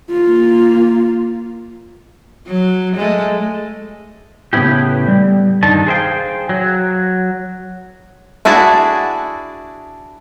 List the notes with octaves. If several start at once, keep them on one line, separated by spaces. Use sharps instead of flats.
A#3 F4
F#3
G#3 A3
A2 C#3 G3 B3 E4 G4
G3
G2 D3 D#3 D#4 A5
G#4 A4 C5 E5 F5 G5
F#3
D4 E4 F#4 G#4 A5